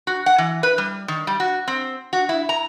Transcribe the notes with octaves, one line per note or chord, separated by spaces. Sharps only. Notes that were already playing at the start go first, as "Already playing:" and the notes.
F#4
F#5
E3
B4
G3
D#3
G3
F#4
C4
F#4
E4
A#5